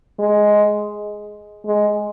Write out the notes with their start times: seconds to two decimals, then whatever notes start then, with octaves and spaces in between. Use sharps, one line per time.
0.19 G#3
1.66 G#3